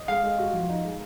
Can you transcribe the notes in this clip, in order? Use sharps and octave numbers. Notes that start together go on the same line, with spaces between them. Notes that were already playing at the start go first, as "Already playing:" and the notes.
Already playing: D#5
G#3 F5
G#3
F#4
F3
D#4
G#3